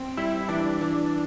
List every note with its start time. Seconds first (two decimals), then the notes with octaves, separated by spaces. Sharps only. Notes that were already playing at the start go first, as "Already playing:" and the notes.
Already playing: C4
0.17 G3 E4
0.49 E3 D4
0.81 E3